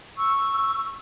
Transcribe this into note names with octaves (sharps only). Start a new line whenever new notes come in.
C#6 E6